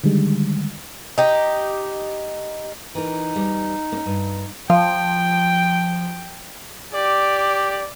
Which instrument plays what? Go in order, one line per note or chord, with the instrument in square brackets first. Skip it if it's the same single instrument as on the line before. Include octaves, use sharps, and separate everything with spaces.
[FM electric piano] D3 D#3 G3 G#3
[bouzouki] D#4 G4
[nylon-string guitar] E3 A#4 [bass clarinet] D#4
[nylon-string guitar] E2 G3
A#3 C#4
G2
[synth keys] F3 [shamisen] F5 [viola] G5
[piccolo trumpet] G4 [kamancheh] D5